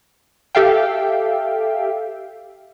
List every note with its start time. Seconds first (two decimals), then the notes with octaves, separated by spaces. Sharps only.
0.55 G4 A4 E5 F5 G5